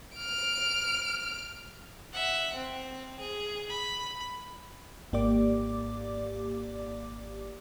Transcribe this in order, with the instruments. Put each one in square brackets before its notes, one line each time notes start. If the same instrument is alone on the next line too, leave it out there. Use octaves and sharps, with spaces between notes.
[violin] F6 D7
[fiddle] E5 F#5
C4
G#4
B5
[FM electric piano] G#1 G#2 A#3 G4 D5 D6